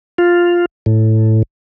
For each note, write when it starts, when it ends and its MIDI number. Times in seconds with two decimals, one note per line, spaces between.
0.18 0.65 65
0.86 1.43 45